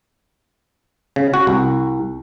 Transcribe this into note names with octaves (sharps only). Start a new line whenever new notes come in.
C#3
F#4
C2